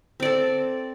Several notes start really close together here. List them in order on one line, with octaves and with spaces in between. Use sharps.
C4 D5 A4